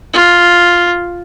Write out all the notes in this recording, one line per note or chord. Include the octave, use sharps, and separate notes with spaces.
F4